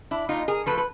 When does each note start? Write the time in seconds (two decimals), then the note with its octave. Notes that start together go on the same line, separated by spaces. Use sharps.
0.11 D4 E4
0.29 A#2 D#4 F4
0.48 G#4 A#4
0.66 F3 A3 A4 B4
0.78 B4